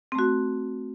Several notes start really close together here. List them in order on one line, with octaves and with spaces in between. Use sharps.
C4 A3 F#4